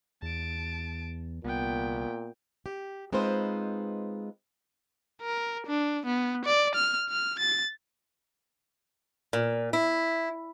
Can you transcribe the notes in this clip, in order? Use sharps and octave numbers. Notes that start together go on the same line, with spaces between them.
E2 A5 D7
C2 A#2 B3 G5
G4
G#3 C4 D#4 F4 B4 C5
A#4
D4
B3
D5
F6
F6
A6
A#2
E4